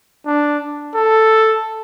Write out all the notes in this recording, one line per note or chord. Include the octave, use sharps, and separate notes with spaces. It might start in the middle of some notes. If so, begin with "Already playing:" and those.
D4
A4